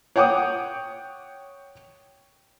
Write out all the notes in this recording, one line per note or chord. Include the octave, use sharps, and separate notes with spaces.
C#5 F#5 G5 D6 D#6